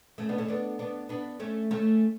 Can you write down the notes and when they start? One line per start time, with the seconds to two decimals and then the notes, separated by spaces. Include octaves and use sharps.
0.18 A3 C#4
0.29 B3 D4
0.38 A3 C#4
0.48 B3 D4
0.79 B3 D4
1.09 B3 D4
1.40 A3 C#4
1.71 A3 C#4